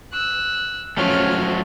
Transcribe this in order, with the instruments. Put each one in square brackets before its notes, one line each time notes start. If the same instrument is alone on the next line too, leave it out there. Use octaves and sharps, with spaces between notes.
[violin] E6 F#6
[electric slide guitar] F3 F#3 A3 [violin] C#4 F6